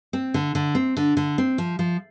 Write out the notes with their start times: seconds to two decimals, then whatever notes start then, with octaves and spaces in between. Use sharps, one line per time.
0.13 C4
0.34 D3
0.55 D3
0.75 C4
0.97 D3
1.17 D3
1.38 C4
1.58 F3
1.79 F3